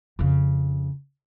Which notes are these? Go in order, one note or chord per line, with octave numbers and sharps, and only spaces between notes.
F2 C#3